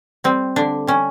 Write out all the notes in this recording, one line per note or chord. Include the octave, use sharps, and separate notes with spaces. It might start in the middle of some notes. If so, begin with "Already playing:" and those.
G3 C4
D3 D4
G3 C#4